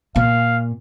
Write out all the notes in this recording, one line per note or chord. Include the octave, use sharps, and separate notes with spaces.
A#2 F5